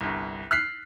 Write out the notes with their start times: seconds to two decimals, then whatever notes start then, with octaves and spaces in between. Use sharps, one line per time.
0.01 G1 C2
0.51 F6 F#6 B6 C7